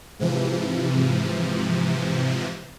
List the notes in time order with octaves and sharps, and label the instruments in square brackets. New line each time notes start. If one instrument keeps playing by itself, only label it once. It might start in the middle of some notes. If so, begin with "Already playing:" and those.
[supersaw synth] G#2 C3 E3 F3